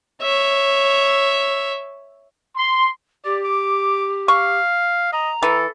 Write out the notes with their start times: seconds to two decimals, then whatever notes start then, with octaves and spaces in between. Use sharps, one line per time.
0.22 C#5 E5
2.56 C6
3.25 G4 D5
3.44 D6
4.28 F5 C#6
5.13 D#5 A#5
5.43 E3 A4